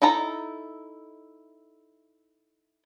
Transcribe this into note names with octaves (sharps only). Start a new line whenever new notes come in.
D#4 E4 A4 A#5